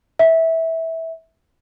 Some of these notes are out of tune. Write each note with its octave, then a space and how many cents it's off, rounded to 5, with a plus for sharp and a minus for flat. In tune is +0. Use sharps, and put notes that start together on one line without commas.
E5 -15